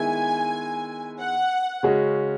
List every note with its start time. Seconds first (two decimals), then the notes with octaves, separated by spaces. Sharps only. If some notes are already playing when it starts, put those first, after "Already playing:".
Already playing: D#3 G#3 B3 E4 G#5
1.20 F#5
1.83 C#3 G#3 C#4 F#4